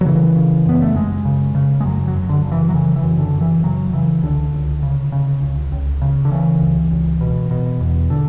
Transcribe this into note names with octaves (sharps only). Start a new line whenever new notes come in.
F#3
C#3 E3
C#3
F#2 B3
A3
F#2 G#3
C#3
C#3
G#3
F#2 F#3
F#3
F#2
D3
C#3
E3
F#3
C#3 E3
E3
F#2
D3
F#2
E3
C#3 F#3
C#3 E3
C#2 D3
C#2
C#3
C#3
C#2
C#2
C#3
D3
C#3 E3
C#2
C#2
B2
B2
E2
D3